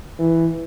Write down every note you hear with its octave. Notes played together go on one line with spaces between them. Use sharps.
E3